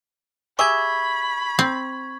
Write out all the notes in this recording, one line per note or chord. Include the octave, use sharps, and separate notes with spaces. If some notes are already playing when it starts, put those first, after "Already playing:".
G4 G#4 E5 B5 C#6 G#6
C4